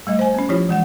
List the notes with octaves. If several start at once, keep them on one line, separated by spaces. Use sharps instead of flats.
G3 A3 D#5
C5 G#5
B3 C#4
F3 E4 F4 G4 C#5
E3 G#3 F#5